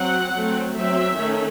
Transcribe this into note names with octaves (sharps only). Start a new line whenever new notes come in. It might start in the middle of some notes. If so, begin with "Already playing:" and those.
Already playing: F#3 C4 F#5
F#3 A3 C4
F#3 C4 E5
D#3 A3 C#4